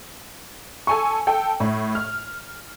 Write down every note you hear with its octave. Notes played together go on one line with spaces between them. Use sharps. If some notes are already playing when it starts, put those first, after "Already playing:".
A4 G#5 C#6
A4 G5
A2
F6